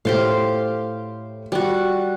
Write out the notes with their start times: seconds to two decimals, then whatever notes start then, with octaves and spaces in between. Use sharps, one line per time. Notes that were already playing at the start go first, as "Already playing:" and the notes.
0.05 A2 G4 C5 F5
1.52 G3 F#4